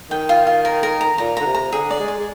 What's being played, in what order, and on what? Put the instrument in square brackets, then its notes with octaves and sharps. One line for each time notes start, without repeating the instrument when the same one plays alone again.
[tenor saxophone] D#3 [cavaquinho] G5
[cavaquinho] F4
F4
A#4
A#4
A#5
[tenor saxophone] A#2 [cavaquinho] A#5
[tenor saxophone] D3 [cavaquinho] A#5
[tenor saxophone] C3
[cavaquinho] A#5
[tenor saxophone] D3 [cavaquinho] G#4
[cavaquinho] D5
[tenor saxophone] G#3
[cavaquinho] D5
[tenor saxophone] G#3